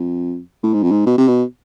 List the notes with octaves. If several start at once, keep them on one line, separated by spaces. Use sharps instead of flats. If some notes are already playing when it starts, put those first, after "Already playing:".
Already playing: F2
A2
G#2
F2
G#2
B2
C3
B2